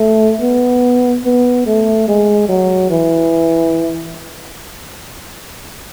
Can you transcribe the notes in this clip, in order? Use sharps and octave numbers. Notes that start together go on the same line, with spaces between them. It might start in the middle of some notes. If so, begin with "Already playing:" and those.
Already playing: A3
B3
B3
A3
G#3
F#3
E3